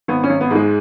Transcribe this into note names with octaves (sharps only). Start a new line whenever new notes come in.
G#1 B3
C#4
G#1
B3
G#2 G#3